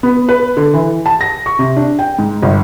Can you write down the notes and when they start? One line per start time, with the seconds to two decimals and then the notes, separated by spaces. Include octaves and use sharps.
0.03 B3
0.29 B4
0.57 D3
0.74 E3
1.06 A5
1.21 A#6
1.46 C#6
1.59 C3
1.76 D4
1.99 G5
2.19 G#2
2.42 G1